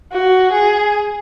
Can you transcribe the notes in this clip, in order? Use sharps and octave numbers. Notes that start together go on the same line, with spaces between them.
F#4
G#4